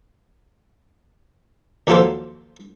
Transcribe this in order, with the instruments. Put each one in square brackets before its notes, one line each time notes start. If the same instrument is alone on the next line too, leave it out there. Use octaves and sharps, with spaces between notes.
[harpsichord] D#2 F3 F#3 F4 A4 C5